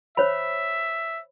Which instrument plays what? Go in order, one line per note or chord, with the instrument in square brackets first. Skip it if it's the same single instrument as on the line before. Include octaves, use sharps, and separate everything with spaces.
[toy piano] C5 C#5 B5 [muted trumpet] E5